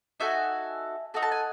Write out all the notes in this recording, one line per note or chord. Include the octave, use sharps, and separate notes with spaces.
D#4 F#4 A4 E5 G#5
D#4 F#4 A4
A5
G#5